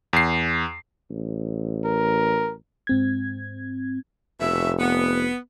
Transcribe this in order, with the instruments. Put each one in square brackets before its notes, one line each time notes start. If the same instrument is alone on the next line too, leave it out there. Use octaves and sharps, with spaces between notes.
[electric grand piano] E2 C7
[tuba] A1
[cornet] A#4
[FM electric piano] G#2 C4 G#6
[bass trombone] F1 [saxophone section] B2 C#4 E5
[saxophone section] B3